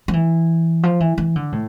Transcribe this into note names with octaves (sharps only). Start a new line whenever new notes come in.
F3
E3
F3
E3
E3
D3
A2